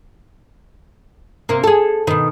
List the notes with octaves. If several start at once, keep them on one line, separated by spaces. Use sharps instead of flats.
C3 A#3
G#4 A4
B2 D#3